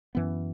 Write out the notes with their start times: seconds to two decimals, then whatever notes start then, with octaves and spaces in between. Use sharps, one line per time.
0.15 F#2 E3 B3